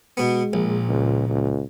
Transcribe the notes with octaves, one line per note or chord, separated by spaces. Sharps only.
B2 G#3 B3
A#1 A#2
C#2
C#2